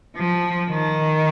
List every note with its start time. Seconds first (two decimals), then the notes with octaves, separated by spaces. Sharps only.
0.17 F3
0.70 D#3